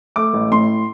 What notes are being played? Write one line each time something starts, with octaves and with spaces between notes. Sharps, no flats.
A3 D6
A1
A2 C6